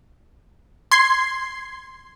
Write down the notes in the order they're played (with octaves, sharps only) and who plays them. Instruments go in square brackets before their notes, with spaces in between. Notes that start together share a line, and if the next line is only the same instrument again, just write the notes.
[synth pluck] C6 G#6 C7